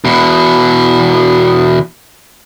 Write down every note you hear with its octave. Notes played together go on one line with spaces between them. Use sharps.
E2 B2